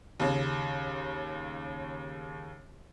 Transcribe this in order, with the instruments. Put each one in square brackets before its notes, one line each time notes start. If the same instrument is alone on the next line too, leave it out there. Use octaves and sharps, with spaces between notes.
[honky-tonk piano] D#2 C#3